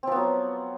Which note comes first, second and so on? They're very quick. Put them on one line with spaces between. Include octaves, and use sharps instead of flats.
C4 F3 B3 F#3